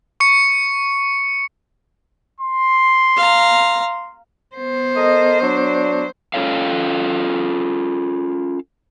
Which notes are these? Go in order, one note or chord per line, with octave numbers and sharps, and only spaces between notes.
C#6 C#7
C6
F5 A#5
B3 C5
A4 A#4 D#5
F#3 D4
C#4 F4 A4 C#5 F5